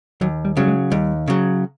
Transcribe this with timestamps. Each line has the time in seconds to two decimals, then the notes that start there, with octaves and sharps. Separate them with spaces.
0.21 D#2 F#3
0.45 G3
0.57 C#3 F#3 G3
0.68 G#3
0.92 D#2 G3
1.28 C#3 F#3